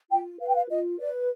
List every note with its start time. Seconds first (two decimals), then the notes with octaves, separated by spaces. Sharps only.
0.11 F4 G5
0.41 B4 F5
0.49 G5
0.56 F5
0.69 F4 D#5
1.00 B4 D5